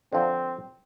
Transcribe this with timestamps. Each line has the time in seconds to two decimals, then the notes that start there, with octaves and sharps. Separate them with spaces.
0.13 D3 F3 C4